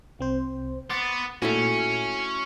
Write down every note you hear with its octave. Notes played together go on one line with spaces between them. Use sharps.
C2 C4 C5
B3 C6 D6 A6
A#2 A3 C#4 E4 F#4